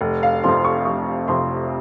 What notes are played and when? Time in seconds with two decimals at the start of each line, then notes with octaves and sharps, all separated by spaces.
0.01 F1
0.23 F5
0.44 F2 C3 F3 C6
0.65 C#6
0.85 F1 C#6
1.28 F2 C3 F3 C6